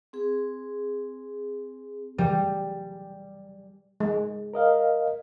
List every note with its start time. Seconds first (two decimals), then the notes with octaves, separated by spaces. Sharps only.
0.13 C4 G#4
2.18 G3
4.00 G#3
4.54 A#4 D#5 F5